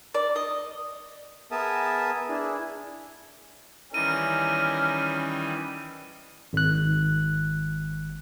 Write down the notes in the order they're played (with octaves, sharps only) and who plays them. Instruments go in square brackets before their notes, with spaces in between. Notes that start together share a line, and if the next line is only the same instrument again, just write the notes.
[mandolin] D5
D#5
[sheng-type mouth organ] B3 G#4 A#4 E5 A5 D#6
D4 E4 G#4
[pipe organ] D#3 E3 G3 [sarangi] C#4 [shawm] A#4 [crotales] D#7
[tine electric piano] G#1 F#6